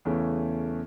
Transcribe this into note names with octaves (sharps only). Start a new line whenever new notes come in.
E2 C#3 E3 A3 C#4